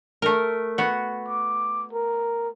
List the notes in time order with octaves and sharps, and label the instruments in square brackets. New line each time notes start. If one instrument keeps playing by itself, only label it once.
[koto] A3 A#4
B3 F#4
[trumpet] D6
A#4